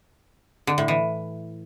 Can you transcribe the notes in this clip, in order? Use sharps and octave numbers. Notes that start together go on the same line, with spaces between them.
D3
A2
E3